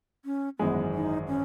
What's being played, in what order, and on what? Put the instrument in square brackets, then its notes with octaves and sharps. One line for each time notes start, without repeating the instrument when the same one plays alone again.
[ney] C#4
[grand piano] G#1 F#2 E3 G#3 [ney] B3
[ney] D#4
C#4